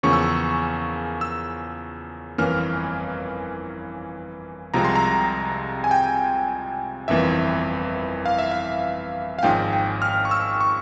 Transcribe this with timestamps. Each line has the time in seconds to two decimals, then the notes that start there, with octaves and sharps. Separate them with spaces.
0.03 E2 C#3 F3 A#3 C#4 C#6
0.13 E6
0.22 C#6
1.21 E6
2.38 G1 F2 E3 A#3 C#4 F6
4.74 C2 C3 F3 G#3 C4 A#5
4.84 C6
4.96 A#5
5.84 G#5
5.91 G5
7.08 G1 F2 E3 A#3 E5
8.26 F5
8.39 E5
8.51 F5
9.39 F5
9.43 G#1 G#2 F3 A#3 C#4 G5
9.73 G5
10.02 F6
10.25 C#6
10.31 E6
10.60 C#6